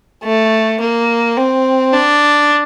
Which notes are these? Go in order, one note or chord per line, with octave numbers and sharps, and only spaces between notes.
A3
A#3
C4
D4